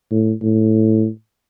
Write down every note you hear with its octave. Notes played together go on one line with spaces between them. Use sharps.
A2
A2